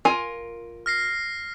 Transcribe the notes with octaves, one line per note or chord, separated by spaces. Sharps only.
F4 A#4 G#5
F6 A#6 C7